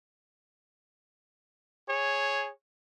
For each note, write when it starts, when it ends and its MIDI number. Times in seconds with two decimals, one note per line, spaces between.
1.89 2.50 68
1.89 2.50 73